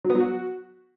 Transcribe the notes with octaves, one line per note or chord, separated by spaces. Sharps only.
F#3
B3
F#3
F#4